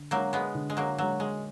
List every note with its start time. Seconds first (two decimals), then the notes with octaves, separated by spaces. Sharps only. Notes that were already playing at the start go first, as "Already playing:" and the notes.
Already playing: D3
0.11 F#3 G#3 A#3 D4
0.33 G#3 B3
0.54 D3
0.70 G#3
0.77 F#3 A#3
0.98 F#3 G#3 D4
1.20 G#3